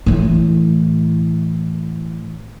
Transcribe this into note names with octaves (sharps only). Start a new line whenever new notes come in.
A2 E3